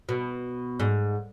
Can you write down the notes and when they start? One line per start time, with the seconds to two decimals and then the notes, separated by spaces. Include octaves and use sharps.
0.09 B2
0.80 G#2